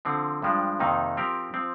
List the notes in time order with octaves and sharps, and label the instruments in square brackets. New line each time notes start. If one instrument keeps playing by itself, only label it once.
[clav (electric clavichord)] D3 F3 C4
G2 F3 G#3 D4
F2 C3 D#3 A#3 D#4
F3 C4 G4 A#4
F3 C4